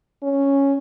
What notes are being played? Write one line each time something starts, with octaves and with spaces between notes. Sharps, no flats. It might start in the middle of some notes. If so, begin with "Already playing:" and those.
C#4